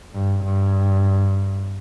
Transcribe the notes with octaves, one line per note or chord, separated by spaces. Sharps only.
G2
G2